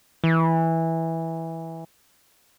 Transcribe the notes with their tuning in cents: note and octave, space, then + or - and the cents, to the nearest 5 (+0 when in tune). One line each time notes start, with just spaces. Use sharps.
E3 -10